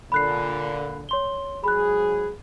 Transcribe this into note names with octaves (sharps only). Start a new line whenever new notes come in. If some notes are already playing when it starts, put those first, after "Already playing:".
A#2 D3 B5 F#6 C7
C#5 C6 G7
G#2 F#3 G#4 B5 F#6